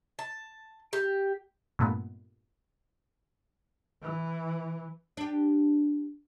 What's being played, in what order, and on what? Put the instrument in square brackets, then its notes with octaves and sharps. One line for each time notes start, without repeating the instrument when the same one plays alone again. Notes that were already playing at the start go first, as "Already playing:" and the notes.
[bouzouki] A5
G4
[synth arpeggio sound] G2 A#2 A3 B3
[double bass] E3
[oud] D4 G4